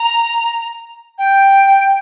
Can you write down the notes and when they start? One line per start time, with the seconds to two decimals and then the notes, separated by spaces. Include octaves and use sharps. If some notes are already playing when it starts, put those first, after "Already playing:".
Already playing: A#5
1.18 G5